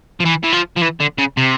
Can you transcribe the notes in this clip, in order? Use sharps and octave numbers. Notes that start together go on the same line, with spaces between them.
F3
E3
E3
F3
F3
E3
D3
C#3
C3